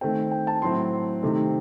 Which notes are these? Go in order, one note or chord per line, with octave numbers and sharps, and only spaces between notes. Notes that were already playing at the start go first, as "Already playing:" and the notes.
D#3 A3 C4 G5
G5
A5
A2 F#3 C4 E4 C6
C3 D#3 A3 C4